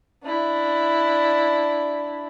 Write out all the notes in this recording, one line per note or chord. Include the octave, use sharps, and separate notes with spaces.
D4 E4